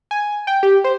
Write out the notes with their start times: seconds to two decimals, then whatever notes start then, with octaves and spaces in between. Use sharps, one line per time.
0.11 G#5
0.47 G5
0.63 G4
0.84 C5